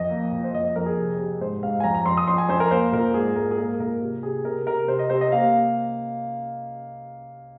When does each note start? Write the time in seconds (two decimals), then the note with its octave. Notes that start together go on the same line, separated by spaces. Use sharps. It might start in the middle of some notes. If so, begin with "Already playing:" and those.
Already playing: F2 D#5
0.10 A#3
0.32 A#2
0.44 C5
0.53 F2 D#5
0.65 D#5
0.76 F2 A#4
0.86 G#4
0.97 C3
1.19 C3
1.40 G#2 C5
1.63 G#2 F5
1.80 G#5
1.84 F2 A#5
1.95 A#5
2.05 F2 C6
2.17 D#6
2.28 F2 C6
2.38 G#5
2.49 F2 C5
2.60 A#4
2.71 A#3 C5
2.92 A#2 A#4
3.14 G#2 G#4
3.36 G#2 A#4
3.51 G#4
3.57 A#3 A#4
3.80 A#2 A#4
4.01 C3
4.23 C3 G#4
4.45 C3 A#4
4.66 C3 A#4
4.88 C3 C5
4.99 D#5
5.10 C3 C5
5.21 D#5
5.32 A#3 F5